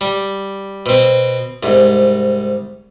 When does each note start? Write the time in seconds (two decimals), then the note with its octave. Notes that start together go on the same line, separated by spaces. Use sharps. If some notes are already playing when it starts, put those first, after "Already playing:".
0.01 G3
0.86 B2 C4
1.63 C2 G#2